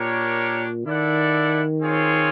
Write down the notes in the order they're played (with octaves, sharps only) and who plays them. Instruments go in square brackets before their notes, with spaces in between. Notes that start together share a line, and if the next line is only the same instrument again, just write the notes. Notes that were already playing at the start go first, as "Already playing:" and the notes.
Already playing: [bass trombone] A#2 [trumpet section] D4 G4 A#4 C#5
[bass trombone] D#3 [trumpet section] E4 A4 D5 F#5
[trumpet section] C4 F4 G#4 C#5